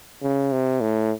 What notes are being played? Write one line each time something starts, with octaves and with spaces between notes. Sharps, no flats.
C#3
C3
A2